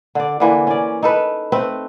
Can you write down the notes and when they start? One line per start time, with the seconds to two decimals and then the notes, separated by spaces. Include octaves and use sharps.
0.15 D3 D5
0.40 D3 E3 A#3
0.67 C#4 D5
1.03 D#4 A4 B4
1.52 A3 C4 B4